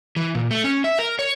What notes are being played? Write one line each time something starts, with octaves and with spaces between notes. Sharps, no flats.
E3
A#2
A3
C#4
E5
A#4
C#5